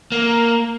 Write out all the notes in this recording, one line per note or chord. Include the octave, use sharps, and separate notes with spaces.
A#3